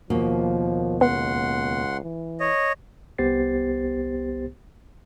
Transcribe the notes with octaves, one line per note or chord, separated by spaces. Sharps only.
D#2 B2 F3 A#3
C#2 B3 F#5 C6
E3
C#5 D#5
C2 B3 G4 C5 A6 C7